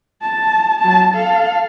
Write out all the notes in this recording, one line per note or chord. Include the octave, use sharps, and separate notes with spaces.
A5
F#3 A5
A4 F5